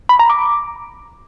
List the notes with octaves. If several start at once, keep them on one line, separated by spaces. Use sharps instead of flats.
B5
A#5
D6